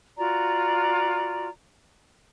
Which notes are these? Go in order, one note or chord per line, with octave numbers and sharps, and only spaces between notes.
F4 F#4 D5 A#5